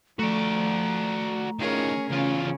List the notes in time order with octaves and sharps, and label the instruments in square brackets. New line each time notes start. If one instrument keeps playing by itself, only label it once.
[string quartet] F3 [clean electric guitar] A3 [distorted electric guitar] F#4 D5 [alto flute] A#5
[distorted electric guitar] D#3 F3 [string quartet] C#4 G#4 A#4
[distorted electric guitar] E2 F4 [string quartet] C#3 [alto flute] C#4